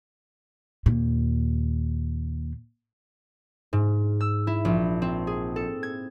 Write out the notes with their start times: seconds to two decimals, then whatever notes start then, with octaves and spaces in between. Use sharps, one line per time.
0.86 D#2 A#2
3.73 G#2
4.20 E6
4.47 E4
4.65 A#1
5.02 C4
5.27 G#4
5.56 A4
5.83 G#6